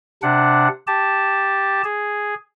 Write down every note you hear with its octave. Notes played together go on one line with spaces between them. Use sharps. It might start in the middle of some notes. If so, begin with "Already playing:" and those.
C3 D4 F#5
G4 A5
G#4